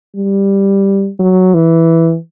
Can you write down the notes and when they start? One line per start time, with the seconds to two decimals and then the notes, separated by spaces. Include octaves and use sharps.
0.16 G3
1.20 F#3
1.54 E3